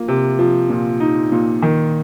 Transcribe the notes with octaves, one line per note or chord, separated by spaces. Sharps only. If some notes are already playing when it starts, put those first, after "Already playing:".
Already playing: A#3 F4
C3
F3
A#2
D#4
A#2
D#3